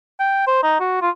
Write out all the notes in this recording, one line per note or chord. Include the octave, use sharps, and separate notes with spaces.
G5
C5
D#4
F#4
F4